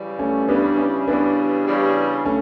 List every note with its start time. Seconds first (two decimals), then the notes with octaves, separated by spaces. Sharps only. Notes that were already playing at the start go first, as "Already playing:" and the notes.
Already playing: C#3 E3 G3
0.19 A3 C#4
0.48 C#3 E3 G3 B3 D4
0.78 C#4 E4
1.08 C#3 E3 G3 B3 D4
1.67 C#3 E3 G3
2.26 A3 C#4